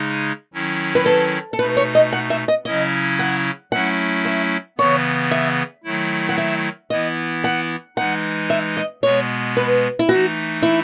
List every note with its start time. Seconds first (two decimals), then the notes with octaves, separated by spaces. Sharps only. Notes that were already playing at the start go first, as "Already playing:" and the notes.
Already playing: C#3 G#3 D#4
0.54 D#3 F#3 C#4 E4
0.95 B4
1.06 A4
1.53 A4
1.59 B2 A3 D#4 B4
1.77 C#5
1.95 D#5
2.13 F#5
2.30 E5
2.48 D#5
2.65 C#3 F#3 C#4 E4 D#5
3.19 F#5
3.72 F#3 A3 C#4 E4 F#5
4.25 E5
4.78 C#3 E3 B3 C#5
5.31 E5
5.84 D#3 F#3 A3 E4
6.29 F#5
6.38 E5
6.90 E3 B3 E4 D#5
7.44 F#5
7.97 E3 G#3 D#4 F#5
8.50 E5
8.77 D#5
9.03 B2 G#3 B3 C#5
9.57 B4
9.99 E4
10.09 E3 A3 D#4 F#4
10.63 E4